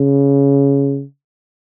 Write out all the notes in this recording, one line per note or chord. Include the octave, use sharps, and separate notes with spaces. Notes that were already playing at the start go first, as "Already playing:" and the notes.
Already playing: C#3